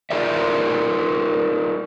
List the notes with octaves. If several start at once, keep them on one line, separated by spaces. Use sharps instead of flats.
D#4 F4 G#4 A#4 D5 E5